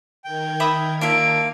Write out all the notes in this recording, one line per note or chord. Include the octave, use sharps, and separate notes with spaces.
D#3 A#4 G5 G#6
E5 B5 D#6
A#3 D4 F4 E5 F5 D7